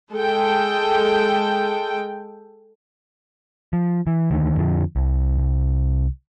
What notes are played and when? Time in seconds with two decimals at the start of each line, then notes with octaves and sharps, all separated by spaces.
0.12 G#3 A4 G5
3.73 F3
4.07 E3
4.31 D2 D#3
4.57 F2 D3 F3
4.96 C2
5.38 C2